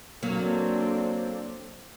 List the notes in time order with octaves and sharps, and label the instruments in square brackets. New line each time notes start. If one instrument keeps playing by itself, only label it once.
[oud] F#3 A#3 [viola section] C4 D4 A4